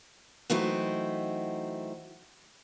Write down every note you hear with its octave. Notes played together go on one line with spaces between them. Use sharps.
E3 F#3 A3 C4 D#4 E4